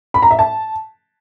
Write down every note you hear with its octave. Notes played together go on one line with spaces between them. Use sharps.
B5
A#5
E5
A5